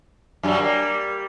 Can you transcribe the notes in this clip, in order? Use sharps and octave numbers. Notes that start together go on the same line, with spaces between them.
F#2 F#3 G3
G3 A#3